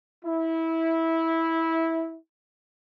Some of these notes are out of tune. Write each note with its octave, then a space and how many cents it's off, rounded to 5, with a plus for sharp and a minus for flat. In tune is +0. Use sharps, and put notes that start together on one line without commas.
E4 -15